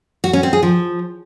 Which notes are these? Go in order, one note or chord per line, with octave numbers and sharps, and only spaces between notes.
F#4
C#4
C4
G#4
F3